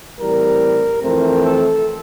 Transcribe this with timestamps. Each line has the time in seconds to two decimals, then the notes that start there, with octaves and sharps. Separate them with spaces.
0.20 A2 E3 G3 C4 A#4
1.03 F2 E3 A3 C4 A#4
1.44 A4